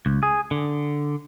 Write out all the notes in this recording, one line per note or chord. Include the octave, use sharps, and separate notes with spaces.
C#2
G#4
D3